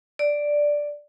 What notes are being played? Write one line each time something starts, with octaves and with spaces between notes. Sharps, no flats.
D5